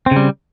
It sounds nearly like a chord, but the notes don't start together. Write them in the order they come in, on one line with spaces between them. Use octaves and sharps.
C4 C#3 G3